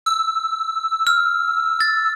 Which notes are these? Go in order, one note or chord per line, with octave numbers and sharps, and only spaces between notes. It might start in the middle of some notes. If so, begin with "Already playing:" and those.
E6
F6
A6